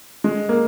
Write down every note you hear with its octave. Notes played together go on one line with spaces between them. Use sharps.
G#3
A#3